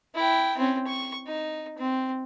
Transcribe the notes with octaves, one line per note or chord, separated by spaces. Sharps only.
E4 G5
C4 C#4
C#6
D#4
C4